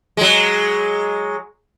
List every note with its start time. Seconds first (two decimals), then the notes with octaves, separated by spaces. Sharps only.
0.17 F#3 G#3